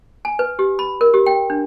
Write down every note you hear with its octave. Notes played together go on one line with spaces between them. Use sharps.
G#5
B4
G4
B5
A#4
G4
G5
D4